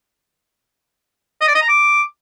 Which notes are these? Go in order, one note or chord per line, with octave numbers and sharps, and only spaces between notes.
D#5
D5
D#5
A#5
D6